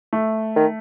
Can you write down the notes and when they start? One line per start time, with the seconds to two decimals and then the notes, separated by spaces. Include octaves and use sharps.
0.13 A3
0.56 D#3